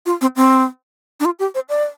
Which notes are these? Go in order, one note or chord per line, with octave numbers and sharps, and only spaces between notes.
F4
C4
C4
D4
F4
G4
C5
D5